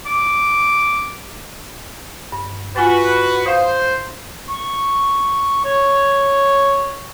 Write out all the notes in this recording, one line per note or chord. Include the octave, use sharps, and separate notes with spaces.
D6
G2
F4 F#4 B4 G#5 A6
C5 F5 D#6
C#6
C#5